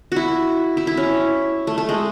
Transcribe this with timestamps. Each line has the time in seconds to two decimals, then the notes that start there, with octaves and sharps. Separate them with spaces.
0.12 E4 F#4
0.77 E4
0.87 E4
0.97 C#4
1.67 A3
1.78 A3
1.89 G#3